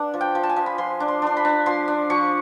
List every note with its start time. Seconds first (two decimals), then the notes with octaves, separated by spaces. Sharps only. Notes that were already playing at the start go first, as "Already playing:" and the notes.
Already playing: D4 B4 F#5
0.14 F3
0.21 G5
0.35 F3
0.43 A5
0.49 G#5
0.56 F3
0.66 B5
0.78 F3 C6
1.00 D4
1.08 C6
1.22 D4 C6
1.37 B5
1.45 D4
1.66 F3 C6
1.88 D4
2.10 F3 C#6